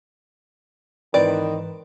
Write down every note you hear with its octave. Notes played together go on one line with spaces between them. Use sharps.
G#2 D#3 E3 C4 B4 D5